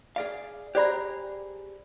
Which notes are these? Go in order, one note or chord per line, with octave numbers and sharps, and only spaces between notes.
G#4 D5 F5
G4 G#4 C5 D5 A#5 B5